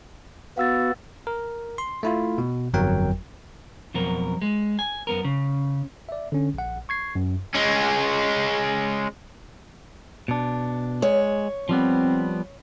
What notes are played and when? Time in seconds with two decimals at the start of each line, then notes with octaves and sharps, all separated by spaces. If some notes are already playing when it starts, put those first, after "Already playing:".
0.58 B3 F#4 F5 E6 A6
1.27 A#4
1.78 C6
2.03 A3 E4 F4
2.38 B2
2.74 G1 F2 F#3 A#4 G5
3.94 F2 B2 F#3 A#4
4.42 G#3
4.79 G#5
5.07 F#2 B3 A#4
5.24 C#3
6.09 D5 E5
6.32 D3 C#4
6.54 A#1 F#5
6.89 C#6 G#6 C7
7.15 F#2
7.55 G#3 C#4
10.28 B2 D4
11.02 G#3 C#5
11.69 F3 G3 B3 C4